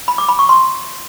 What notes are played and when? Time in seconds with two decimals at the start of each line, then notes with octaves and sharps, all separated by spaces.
0.08 B5
0.18 D6
0.29 B5
0.39 C#6
0.49 C6